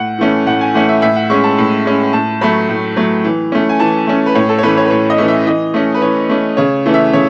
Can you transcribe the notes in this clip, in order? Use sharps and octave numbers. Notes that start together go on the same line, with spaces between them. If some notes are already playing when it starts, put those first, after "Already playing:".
Already playing: A2 F#5
E3 A3 C#4
A2 F#5
G#5
E3 A3 C#4 F#5
E5
A2 E5
F#5
G#3 C#4 C#6
A5
A2
G#3 C#4
A2 A5
F#3 A3 B5
A2
F#3 A3
E3
A3 C#4
G#5
E3 A5
A3 C#4
B4
A2 C#5
A4
C#5
E3 A3 C#4 B4
C#5
B4
A2 C#5
D#5
E3 A3 C#4
E5
E3 D#5
A3 C#4
B4
E3 C#5
A3 C#4
C#3 C#5
E3 A3 C#4
E5
C#3 C#5